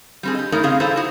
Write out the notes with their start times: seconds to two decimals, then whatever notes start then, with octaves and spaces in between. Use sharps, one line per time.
0.23 G3 C4 G#4
0.35 G4 D#5
0.52 G2 A3 D#4 G#4 A#4 C#5
0.63 C#3 C4 G#4 D#5 F5
0.80 A2 E4 G#4 A4 C5 A#5
0.96 F#4 G#4